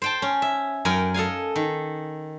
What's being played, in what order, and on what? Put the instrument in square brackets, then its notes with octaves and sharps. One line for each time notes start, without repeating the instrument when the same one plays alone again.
[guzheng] C5 G5 A5
C#4
E5
F#2 A#4 G5 G#5
A4 D#5 F5 G#5
D#3